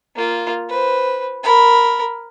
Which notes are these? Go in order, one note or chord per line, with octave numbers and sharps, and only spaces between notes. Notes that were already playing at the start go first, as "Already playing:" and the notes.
A#3 F4
B4 C5
A#4 B5